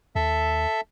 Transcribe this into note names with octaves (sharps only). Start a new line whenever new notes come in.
D#2 A4 E5